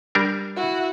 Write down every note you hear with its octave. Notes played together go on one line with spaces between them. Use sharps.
G3 D4 A#4
E4 F#4